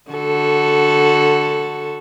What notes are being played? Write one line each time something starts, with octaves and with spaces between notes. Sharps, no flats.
D3 F#4 A4